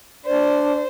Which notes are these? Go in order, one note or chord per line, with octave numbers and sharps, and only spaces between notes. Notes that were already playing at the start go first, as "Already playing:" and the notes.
D4 C5 D5